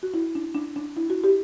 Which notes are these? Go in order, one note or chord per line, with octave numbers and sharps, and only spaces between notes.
F#4
E4
D4
D4
D4
E4
F#4
G4